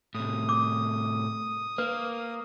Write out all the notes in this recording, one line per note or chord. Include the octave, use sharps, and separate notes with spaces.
A2 C3 D#6
D6
A#3 B4